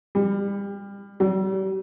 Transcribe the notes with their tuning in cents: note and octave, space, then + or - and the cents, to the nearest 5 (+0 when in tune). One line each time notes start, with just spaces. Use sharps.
G3 +30
G3 -40